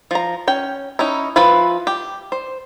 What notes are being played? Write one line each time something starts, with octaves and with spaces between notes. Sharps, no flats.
F3 A#5
C#4 G5
C#4 D#4 E4
F3 E4 F4 B4 B5
G4
C5